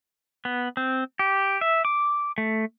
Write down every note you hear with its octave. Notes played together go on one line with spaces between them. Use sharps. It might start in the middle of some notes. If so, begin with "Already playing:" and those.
B3
C4
G4
E5
D6
A3